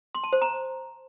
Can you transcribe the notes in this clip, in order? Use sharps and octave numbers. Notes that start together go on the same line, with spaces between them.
C6
A5
C5
A#5